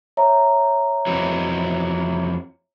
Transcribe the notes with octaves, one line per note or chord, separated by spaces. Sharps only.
C#5 E5 A#5
F2 E3 F#3